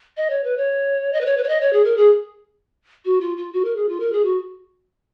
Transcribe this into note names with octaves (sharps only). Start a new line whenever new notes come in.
D#5
C#5
B4
C#5
D#5
B4
C#5
B4
C#5
D#5
C#5
G#4
A#4
G#4
F#4
F4
F4
F#4
A#4
G#4
F4
A#4
G#4
F#4